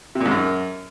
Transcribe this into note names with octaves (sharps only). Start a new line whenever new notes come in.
C3
A#2
G#2
F#2